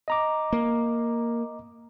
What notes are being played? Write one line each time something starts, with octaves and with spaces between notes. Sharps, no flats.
D#5 A#5 D6
A#3